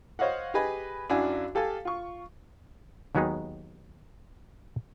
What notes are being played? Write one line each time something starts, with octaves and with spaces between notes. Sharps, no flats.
C5 C#5 D#5 F5 F#5
G4 G#4 B4 D#5 G#5 B5
F#2 D4 E4 F#4 F5 G#5
G4 A4 F5 G#5 A5
F4 C#6
D#2 D#3 F#3 G#3 B3 D#4